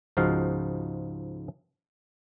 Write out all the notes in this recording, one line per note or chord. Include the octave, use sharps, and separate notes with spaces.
C#2 G#2 F3 D#4 F#4 F5